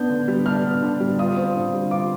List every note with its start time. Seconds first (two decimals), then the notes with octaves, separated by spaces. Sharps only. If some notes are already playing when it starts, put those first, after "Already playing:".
Already playing: B3 D4 G6
0.10 D3
0.28 G3
0.46 D4 F6
0.65 B3
0.82 D3
1.00 G3
1.19 F4 D#6
1.37 C4
1.55 D3
1.74 G3
1.91 F4 D6